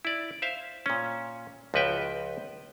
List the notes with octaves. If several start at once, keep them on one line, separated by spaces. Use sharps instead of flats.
E4 D5
C5 E5 F5
A#2 C#4
C#2 F3 F#4 B4 E5 G5